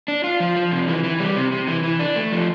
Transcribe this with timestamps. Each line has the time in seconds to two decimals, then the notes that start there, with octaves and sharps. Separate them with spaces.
0.08 D4
0.24 F4
0.40 F3
0.56 F3
0.71 C3
0.88 E3
1.04 E3
1.20 G3
1.36 C3
1.52 C3
1.68 E3
1.83 E3
1.99 D4
2.16 A3
2.32 F3